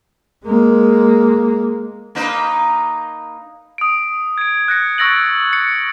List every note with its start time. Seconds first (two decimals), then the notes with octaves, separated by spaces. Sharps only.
0.45 G#3 A#3
2.15 A#3 D#4 B4
3.78 D#6 D7
4.38 G#6 D7
4.68 F#6 A#6 C#7
4.98 C#6 E6 A6 A#6 D7 F#7
5.53 C#7